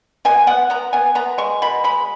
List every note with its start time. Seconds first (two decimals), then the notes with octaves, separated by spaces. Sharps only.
0.25 B2 G#5
0.47 B3 F#5
0.70 B3 A#5
0.93 B3 G#5
1.15 B3 A#5
1.38 G#3 C#6
1.62 B2 B5
1.84 G#3 B5